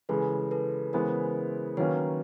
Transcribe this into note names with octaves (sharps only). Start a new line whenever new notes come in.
C#3 E3 G#3 A4 B4
A4 B4
C#3 E3 G#3 B3 E4 A#4 C5
D#3 F#3 A#3 C#4 B4 C#5